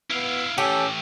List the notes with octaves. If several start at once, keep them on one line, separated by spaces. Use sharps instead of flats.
B3 E4 F5
A2 E3 C#4 G4 A4